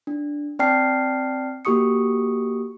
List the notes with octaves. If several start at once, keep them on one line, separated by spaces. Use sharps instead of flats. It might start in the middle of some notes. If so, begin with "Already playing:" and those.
D4
C4 D5 G5 A5 F6 C7
A#3 F#4 G4 C#6 D#6 C#7